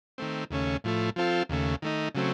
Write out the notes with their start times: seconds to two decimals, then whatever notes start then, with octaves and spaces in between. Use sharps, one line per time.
0.18 D#3 A3 C4
0.51 D#2 C#3 A3 C#4
0.84 A2 F3 A3
1.16 F3 C4 F4 A4
1.49 D#2 C#3 A3
1.82 D#3 A3 D#4
2.15 C#3 F#3 A3 C4